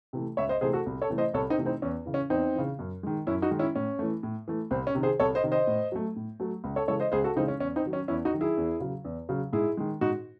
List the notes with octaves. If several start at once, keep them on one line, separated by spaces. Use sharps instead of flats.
C3 E3 A3
C#2 C#5 E5
C5 D#5
C3 E3 A3 G#4 C5
F#4 A4
C2
A4 C#5
C3 E3 A3
C5 D#5
C2 A4 C#5
C4 D#4
C3 E3 A3
C4 D#4
E2 C#4
C#3 E3
C#4
E2 C4 D#4
C#3 E3
F#2
D#3 G#3
F#2 C#4 E4
D#4 F#4
D#3 G#3
C#4 E4
A2 C#4
E3 A3
A2
E3 A3
C2 C4
C#4
C3 D#3
G#4 C5
C2 A4 C#5
C5 D#5
C3 D#3
C5 D#5
A2
F#3 A3
A2
F#3 A3
C#2
A4 C#5
C#3 E3 G#3 A4 C#5
C5 D#5
C#2 G#4 C5
F#4 A4
C#3 E3 G#3 C4 D#4
C#4
E2 C#4
C4 D#4
D#3 F#3
C#4
E2 C#4 E4
D#4 F#4
D#3 F#3
E4 G#4
E2
C#3 F#3
E2
C#3 F#3
G#2 E4 G#4
D#3 G#3
G#2 D#4 F#4